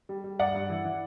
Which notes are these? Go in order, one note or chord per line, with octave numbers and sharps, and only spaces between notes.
G3
G3
G2 D5 F#5
G2
E3
E3